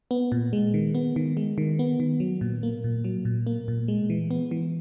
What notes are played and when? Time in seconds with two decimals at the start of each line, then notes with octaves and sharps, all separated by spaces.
0.11 B3
0.32 A#2
0.53 G#3
0.74 D#3
0.95 B3
1.16 D#3
1.37 G#3
1.58 D#3
1.79 B3
2.00 D#3
2.20 F#3
2.41 A#2
2.63 A#3
2.84 A#2
3.04 F#3
3.25 A#2
3.47 A#3
3.68 A#2
3.88 G#3
4.10 E3
4.31 B3
4.51 E3